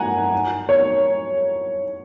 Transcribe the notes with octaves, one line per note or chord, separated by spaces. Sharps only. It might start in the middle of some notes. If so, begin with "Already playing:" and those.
Already playing: F#5 G#5 A#5
C#5